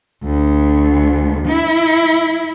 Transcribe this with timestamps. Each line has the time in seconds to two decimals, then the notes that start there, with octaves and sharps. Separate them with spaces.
0.24 D2
1.48 E4